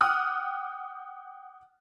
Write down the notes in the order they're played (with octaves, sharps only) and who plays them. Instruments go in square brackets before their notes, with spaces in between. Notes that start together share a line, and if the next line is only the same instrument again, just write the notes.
[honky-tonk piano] F#5 G5 D6 D#6 F6 F#6